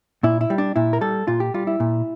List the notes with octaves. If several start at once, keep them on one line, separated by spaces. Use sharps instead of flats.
A#2 E4
E4
G3
D4
A#2 E4
A#4
G3 A4
A#2 F4
G4
G3 F4
E4
A#2